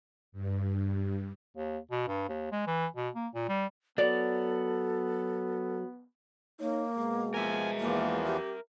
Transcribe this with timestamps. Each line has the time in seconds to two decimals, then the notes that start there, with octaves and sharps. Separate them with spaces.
0.32 G2
1.57 D#2
1.91 B2
2.08 G2
2.29 D#2
2.52 G#3
2.67 E3
2.96 B2
3.15 A#3
3.35 A#2
3.48 G3
3.98 F#3 B3 F#4 A4 C#5 D5
6.60 A#3 D#4 C#5
6.97 B2 G#3
7.34 F3 A#4 E5 G#5
7.80 E2 E3 F3 A#3
8.26 G4